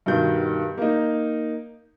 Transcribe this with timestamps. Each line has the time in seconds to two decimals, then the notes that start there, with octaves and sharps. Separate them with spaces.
0.06 G2 B2 D#3 G6
0.78 A#3 D#4